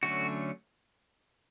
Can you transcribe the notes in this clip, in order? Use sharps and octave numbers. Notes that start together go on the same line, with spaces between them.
D3 F#3 A3 C#4 F#4